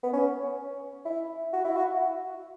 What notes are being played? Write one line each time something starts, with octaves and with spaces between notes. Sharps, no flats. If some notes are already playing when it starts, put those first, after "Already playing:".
B3
C#4
E4
F#4
E4
F#4